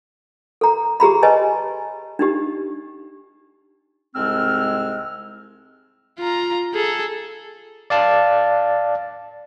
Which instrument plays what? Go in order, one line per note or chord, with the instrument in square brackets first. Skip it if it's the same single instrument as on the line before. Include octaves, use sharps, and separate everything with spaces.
[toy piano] A4 A#5
G4 G#4 A#5 B5
B4 C#5 D#5 G#5 A5
D4 D#4 G4
[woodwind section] C2 G#2 G#3 C4 E6 F6
[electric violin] F4 A#5
G#4 A4
[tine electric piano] D5 F5 A5